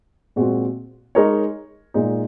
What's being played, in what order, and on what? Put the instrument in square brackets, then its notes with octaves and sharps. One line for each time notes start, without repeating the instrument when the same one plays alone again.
[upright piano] A#2 G#3 C4 F#4
G#3 D#4 A#4 C#5
A#2 G#3 D#4